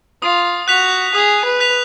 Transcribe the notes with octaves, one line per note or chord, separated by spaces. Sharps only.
F4 D#6
F#4 F#6 B6 F7
G#4 D#6
B4
F#6 B6 F7